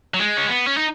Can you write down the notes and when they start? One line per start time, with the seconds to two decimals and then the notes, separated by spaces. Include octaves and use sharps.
0.14 F#3
0.19 G#3
0.37 C#4
0.48 B3
0.67 C#4
0.77 D#4